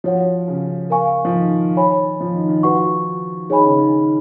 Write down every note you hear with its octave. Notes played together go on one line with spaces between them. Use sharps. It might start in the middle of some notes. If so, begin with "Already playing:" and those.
F3 F#4 C#5 F#5
C#3
A#4 F5 G#5 C#6
F3
D#3
C#5 G#5 B5
F3
D#3
D#3
F3 F#4 B4 F#5 C#6
D#3 G#4 C#5 G#5 B5
C#3
D#3